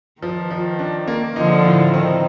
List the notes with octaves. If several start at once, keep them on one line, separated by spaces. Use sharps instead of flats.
D#3 F3
F3
D4
A#3
D3 F3 D#4
A2
D#3 C4